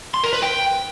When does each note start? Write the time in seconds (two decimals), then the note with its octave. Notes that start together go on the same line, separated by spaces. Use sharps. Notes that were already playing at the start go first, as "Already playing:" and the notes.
0.14 C6
0.24 A#4
0.33 B4
0.42 G5